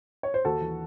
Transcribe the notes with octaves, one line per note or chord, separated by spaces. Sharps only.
C#5
C5
D#2 F#4 A4
E3